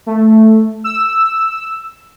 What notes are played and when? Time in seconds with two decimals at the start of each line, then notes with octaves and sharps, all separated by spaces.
0.06 A3
0.84 E6